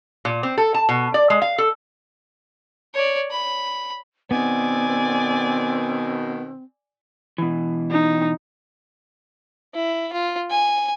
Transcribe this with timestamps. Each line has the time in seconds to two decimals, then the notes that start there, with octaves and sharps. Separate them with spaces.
0.25 A#2
0.43 C4
0.58 A4
0.74 A5
0.89 B2
1.14 D5
1.30 G#3
1.42 F5
1.58 A4
2.94 C#5 D5
3.31 B5
4.31 B2 D#3 B3 C4 D5 G#5
7.38 B2 E3
7.91 D#4
9.75 E4
10.13 F4
10.50 G#5